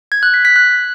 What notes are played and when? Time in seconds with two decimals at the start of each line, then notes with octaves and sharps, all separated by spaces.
0.12 G#6
0.23 F#6
0.34 B6
0.45 B6
0.56 F#6